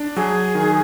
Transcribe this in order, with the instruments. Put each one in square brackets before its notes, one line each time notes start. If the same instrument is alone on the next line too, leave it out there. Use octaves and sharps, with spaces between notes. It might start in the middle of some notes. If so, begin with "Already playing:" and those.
Already playing: [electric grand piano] D4
[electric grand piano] F#3 [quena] G#4
[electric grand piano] D#3